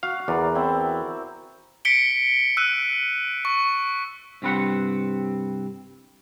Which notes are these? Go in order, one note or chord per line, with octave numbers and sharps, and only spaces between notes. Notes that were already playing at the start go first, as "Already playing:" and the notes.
F#4 F5
E2 A#4 D5
C4 E4
B6 C#7 D7 G7
E6 F#6 D#7
C#6
C2 G2 C4 B4 F#5